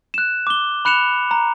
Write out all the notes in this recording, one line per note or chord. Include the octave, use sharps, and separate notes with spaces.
F#6 E7
D6 G7
B5 F#6 C#7 E7 F7
A#5